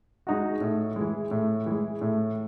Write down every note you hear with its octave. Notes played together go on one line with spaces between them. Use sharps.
G#3 D#4 F#4
A2
E3 G#3
A2
E3 G#3
A2